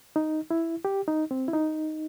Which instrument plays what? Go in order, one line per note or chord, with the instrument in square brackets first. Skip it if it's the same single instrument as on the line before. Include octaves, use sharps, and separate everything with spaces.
[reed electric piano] D#4
E4
G4
D#4
C4
E4
D#4